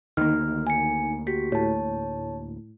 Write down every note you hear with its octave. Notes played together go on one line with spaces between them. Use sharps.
D2 D#3 A#3 F6
G#5 C#7
F#4 G4 B6
A2 C#5 A5